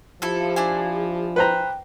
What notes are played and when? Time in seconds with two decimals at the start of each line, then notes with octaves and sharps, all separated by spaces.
0.22 F3 E4 G4 A4
0.56 D4 E4 G#5
1.36 B4 C5 G5 A#5